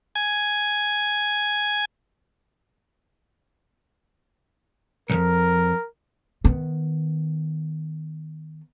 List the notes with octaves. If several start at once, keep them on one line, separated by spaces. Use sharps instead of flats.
G#5 G#6
B1 F2 A#4
D#3 B3